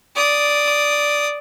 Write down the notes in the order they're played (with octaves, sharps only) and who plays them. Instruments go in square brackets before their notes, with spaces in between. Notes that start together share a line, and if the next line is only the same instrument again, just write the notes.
[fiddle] D5 D#6